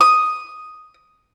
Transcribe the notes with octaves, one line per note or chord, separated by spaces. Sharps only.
D#6